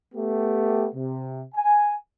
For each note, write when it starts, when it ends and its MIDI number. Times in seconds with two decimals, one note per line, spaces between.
0.15 0.88 57
0.15 0.88 59
0.15 0.88 67
0.95 1.42 48
1.55 1.94 80